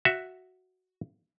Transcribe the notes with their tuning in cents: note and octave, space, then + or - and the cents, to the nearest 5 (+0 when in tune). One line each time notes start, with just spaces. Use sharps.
F#4 +0 E5 +0